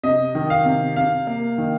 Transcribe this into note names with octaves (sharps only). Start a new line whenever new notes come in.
C3 D#5
D#3
F5
C3
C3 F5
A#3
D#3